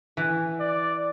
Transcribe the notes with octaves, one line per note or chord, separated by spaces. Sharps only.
E3
D5